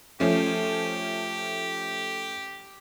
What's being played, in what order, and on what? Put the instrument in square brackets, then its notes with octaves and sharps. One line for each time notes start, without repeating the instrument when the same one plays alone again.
[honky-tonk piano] F3 A3 C#4 [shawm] G4